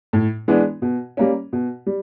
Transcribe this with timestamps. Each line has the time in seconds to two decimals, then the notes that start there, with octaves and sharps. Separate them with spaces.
0.13 A2
0.48 E3 G#3 B3 D4
0.82 B2
1.17 G3 A#3 C#4
1.53 B2
1.86 G3